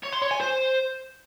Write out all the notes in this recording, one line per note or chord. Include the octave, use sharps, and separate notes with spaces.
C#5
C6
C#5
G#5
C5